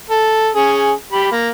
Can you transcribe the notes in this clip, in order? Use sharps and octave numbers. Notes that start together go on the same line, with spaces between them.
A4
C#4 G#4
G4 B5
A#3